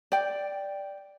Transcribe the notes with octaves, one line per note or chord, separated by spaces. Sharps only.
D5 G5